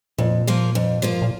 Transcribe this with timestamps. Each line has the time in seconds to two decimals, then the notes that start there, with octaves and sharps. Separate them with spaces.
0.18 F2 A#2
0.47 F3 A#3 F4
0.75 F2
1.02 F3 A#3 F4
1.12 G#2
1.22 A#2